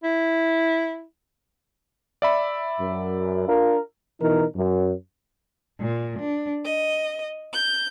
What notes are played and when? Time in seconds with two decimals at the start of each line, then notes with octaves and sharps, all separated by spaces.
0.04 E4
2.22 D5 E5 B5
2.80 F#2
3.48 D4 F4 A#4
4.21 B2 E3 D#4 A#4
4.56 F#2
5.79 A#2
6.18 D4
6.65 D#5
7.53 G6